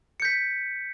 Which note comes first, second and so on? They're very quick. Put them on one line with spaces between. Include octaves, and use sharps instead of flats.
C#7 G6 B6